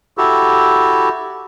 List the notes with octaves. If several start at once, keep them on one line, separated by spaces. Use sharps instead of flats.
E4 F#4 G4 A4